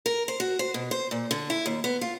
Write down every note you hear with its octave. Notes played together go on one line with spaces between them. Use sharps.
A#4
C5
F#4
C5
B2
C5
A#2
D3
E4
D#2
B3
F4